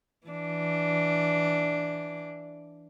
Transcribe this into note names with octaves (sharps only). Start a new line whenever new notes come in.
E3 D4